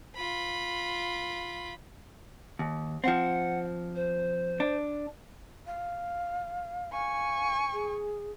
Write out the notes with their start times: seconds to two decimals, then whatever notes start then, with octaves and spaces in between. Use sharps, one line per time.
0.16 F4 B5
2.59 D#2
3.04 F3 C4 F#5
3.95 C5
4.60 D4
5.66 F5
6.93 F5 G#5 C#6
7.73 G#4